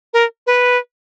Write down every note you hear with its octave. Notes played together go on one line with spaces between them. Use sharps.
A#4
B4